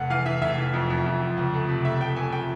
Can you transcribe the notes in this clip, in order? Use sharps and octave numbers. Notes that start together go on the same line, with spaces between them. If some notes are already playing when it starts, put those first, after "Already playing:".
Already playing: F1 F#5
E3 F5
E3 E5
F1 E5
E3
F2
F2
F2
F3
C#2
A3
C3
A3 E5
A3 G5
A3 G#5
A3 G5